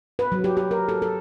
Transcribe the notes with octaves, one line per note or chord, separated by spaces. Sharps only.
B4
F#3
G4
G4
A#4
A4
A4